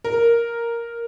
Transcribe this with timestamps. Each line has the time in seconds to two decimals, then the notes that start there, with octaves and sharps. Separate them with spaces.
0.04 A#4